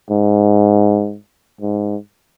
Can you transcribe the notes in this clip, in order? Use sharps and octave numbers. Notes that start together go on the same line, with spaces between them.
G#2
G#2